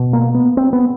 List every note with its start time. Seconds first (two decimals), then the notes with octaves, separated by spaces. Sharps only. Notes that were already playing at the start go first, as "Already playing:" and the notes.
Already playing: B2
0.13 A#3
0.35 B3
0.57 C4
0.73 B3